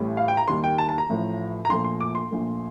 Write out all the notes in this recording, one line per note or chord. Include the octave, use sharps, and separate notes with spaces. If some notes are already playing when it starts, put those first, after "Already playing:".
Already playing: A1 A2 G3
F5
G5
A#5
D#2 D#3 G3 C6
G5
A5
A5
A#5
A1 A2 F3 A3
A#5
A#1 A#2 F3 A3 C6
C6
D6
C6
A#1 A#2 F3 A3